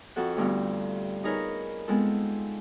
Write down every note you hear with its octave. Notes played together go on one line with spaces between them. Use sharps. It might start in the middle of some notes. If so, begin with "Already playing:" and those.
F2 F#4 A4 F#5
D2 G2 B3 F4
D#4 G#4 A#4 B4 C#5
G#3 B3 C4 F4 A4